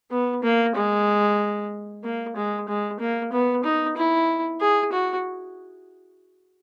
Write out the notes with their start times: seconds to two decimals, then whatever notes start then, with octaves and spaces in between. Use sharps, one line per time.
0.11 B3
0.43 A#3
0.75 G#3
2.04 A#3
2.36 G#3
2.68 G#3
3.00 A#3
3.32 B3
3.64 D#4
3.97 E4
4.61 G#4
4.92 F#4